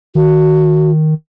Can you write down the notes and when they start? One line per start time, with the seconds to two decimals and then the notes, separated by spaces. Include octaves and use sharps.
0.15 D#3 F#4